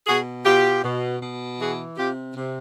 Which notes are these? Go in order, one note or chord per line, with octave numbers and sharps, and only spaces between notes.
B2 F#4 G#4
B2 F4 G4
B2
B2
E3 F#4 G#4
C3 F4 G4
C3